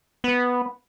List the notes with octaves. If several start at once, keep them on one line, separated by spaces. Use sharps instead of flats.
B3